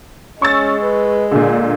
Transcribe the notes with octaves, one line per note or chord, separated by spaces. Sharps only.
G#3 C#4 C#6 E6 A6
B4
A#2 D3 G#4